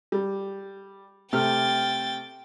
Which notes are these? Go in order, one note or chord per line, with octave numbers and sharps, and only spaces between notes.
G3
C3 A3 G5 F6 A6